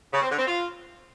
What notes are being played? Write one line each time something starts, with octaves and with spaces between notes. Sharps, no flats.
C#3
C4
D3
C4
F4